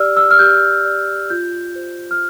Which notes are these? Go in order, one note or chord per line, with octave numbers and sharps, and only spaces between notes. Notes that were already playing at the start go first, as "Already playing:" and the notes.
Already playing: G4 D5 E6 F6
E6
F6
G4 G6
D5
F4 G6
C5
F6